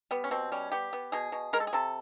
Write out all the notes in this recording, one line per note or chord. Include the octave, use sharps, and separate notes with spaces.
G3 B3
C#4
B2 C4
G3 C#4
B3 G4
B3
B2 G#4
B2
G#3 A#4
A4
G#4
C3 A4